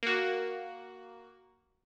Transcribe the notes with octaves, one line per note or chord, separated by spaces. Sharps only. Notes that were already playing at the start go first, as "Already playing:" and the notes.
A#3 F#4